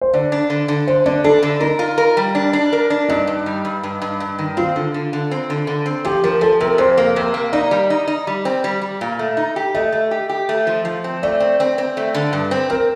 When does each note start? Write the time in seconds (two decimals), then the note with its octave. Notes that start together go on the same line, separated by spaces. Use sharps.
0.01 C5
0.14 D3 D5
0.32 D4
0.50 D3
0.68 D3
0.87 D3 C5
1.06 D3 D4
1.24 D4 A4
1.43 D3
1.60 D#4 A#4
1.79 F4
1.98 A#4
2.17 G3
2.35 D4
2.53 D4
2.73 A#4
2.90 D4
3.09 G2 D#4
3.27 G2
3.46 G3
3.65 G2
3.83 G2
4.02 G2
4.20 G2
4.39 D#3
4.57 C4 F4
4.76 D3
4.94 D3
5.13 D3
5.31 C4
5.50 D3
5.67 D3
5.86 C4
6.05 F3 G4
6.23 F3 A#4
6.41 F3 A4
6.60 C3 A#4
6.78 F2 C5
6.97 A#3
7.16 C3 A#4
7.34 A#3
7.53 D#4 D5
7.71 G3
7.90 D#4
8.08 D#4
8.27 G3
8.45 C4
8.64 G3
8.81 G3
9.01 A#2
9.19 A3
9.37 D#4
9.56 G4
9.75 A3 D#5
9.92 A3
10.11 G4
10.29 G4
10.49 A3
10.67 F3
10.85 F3
11.04 C4
11.23 A3 D5
11.40 C4
11.60 C4
11.78 C4
11.97 A3
12.14 D3
12.33 G2
12.51 C4
12.70 C4 A#4